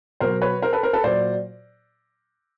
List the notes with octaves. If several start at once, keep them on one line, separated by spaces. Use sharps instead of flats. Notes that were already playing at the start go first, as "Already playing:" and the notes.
B2 F#3 A#4 C5
B4 C#5
A#4 C5
A4 B4
A#4 C5
A4 B4
A#2 F#3 C5 D5